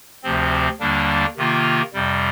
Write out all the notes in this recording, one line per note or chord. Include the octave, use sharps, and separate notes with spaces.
D2 C3 F3 C4
D#2 D3 G3 A#3 D4
C3 D#3 A#3 F4
F2 C3 G3